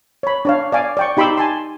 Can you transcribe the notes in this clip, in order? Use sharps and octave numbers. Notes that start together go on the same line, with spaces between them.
C#5 B5
D4 C#5 F5
D5 F5 G#5 D6
D5 G5 C#6
D#4 G4 B5 C6 D6 E6
G#5 A5 C6